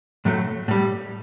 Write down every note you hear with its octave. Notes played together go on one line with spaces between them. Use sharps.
A2 F#3 A3
A2 G3